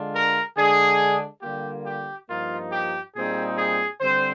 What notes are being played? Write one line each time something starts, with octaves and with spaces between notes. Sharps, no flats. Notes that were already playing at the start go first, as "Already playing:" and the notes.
Already playing: D3 G#3 D4 F4
A#4
D3 G#3 D4 G#4
D3 G3 A#3 F4 G4
G4
G2 F3 A#3 D#4 F4
G4
A#2 G3 C4 D#4 G#4
G#4
D3 G3 C4 C5